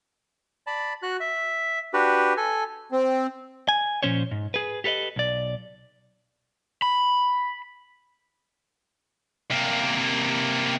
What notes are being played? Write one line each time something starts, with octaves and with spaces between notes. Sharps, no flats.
D5 A5 B5
F#4 F#6
E5
D4 F#4 G4 B4
A4 G#5
C4
G#5
A#2 F3 C#4 C5 C#5
G#2
G#4 B4
G4 A4 B4 D5 D#5
B1 D5
B5
C3 A#3